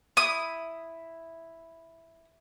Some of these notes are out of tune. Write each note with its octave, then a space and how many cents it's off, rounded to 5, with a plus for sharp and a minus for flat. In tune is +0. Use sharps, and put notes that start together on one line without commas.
E4 +0 D#6 +0